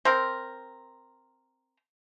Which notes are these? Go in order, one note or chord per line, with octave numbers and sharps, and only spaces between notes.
C4 A#4